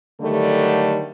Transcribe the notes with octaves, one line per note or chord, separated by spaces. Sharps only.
D3 D#3 F#3 G3 A3